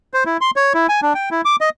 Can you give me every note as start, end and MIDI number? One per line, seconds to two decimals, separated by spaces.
0.14 0.24 72
0.26 0.37 64
0.41 0.51 84
0.56 0.73 73
0.74 0.87 64
0.89 1.00 80
1.02 1.13 62
1.15 1.29 79
1.31 1.41 64
1.45 1.56 86
1.61 1.69 75